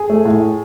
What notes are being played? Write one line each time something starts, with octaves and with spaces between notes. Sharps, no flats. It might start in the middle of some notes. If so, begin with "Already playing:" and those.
Already playing: G#4
A3
A2